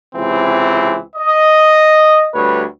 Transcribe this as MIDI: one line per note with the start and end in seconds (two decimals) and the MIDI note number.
0.14 0.97 37
0.14 0.97 48
0.14 0.97 52
0.14 0.97 60
1.16 2.28 75
2.34 2.62 38
2.34 2.62 55
2.34 2.62 71
2.34 2.62 73